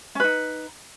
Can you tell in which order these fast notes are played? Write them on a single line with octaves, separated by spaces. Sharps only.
C#4 B4 D#4